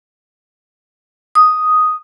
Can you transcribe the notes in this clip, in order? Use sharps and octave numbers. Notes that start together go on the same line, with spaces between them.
D#6